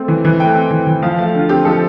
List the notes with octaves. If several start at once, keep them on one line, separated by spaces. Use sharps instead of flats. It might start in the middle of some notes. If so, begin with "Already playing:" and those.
Already playing: A3 C4
E3
E3
A3 G5
C4
E3
E3
F3 F5
A3 F5
D3 F4
C4 G4
F3 A4